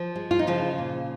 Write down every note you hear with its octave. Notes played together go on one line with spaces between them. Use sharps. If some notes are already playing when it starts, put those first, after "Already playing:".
Already playing: F3
G#3
F4
D#4
C#3 F3 F4
A#2